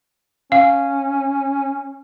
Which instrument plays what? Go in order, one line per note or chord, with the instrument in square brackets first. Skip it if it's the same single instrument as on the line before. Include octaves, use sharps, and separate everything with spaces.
[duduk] C#4 [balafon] F5